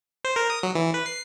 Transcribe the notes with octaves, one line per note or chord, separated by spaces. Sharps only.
C5
A#4
D#6
F#3
E3
B4
C7